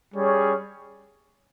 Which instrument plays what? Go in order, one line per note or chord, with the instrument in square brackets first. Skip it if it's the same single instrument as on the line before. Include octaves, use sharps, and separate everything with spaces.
[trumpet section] G3 C#4 G#4 C#5